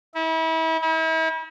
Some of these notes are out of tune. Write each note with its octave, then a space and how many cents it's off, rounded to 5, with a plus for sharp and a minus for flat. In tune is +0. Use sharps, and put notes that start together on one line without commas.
E4 -35
E4 -40